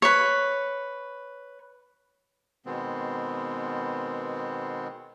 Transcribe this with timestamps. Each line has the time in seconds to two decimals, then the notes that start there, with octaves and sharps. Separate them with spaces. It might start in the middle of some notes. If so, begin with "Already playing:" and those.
0.02 B4 C#5
2.66 B2 D#3 G#3 B3 C4